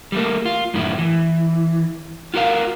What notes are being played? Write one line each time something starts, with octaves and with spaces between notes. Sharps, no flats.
G3 A3 A#3
F4
F#2 A2 D#3 E4
E3
F4 F#4 A#4 C#5 F5